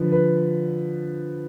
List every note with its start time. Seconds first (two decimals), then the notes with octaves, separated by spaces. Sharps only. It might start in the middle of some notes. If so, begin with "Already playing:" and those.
Already playing: D3 F3 B4
0.12 B4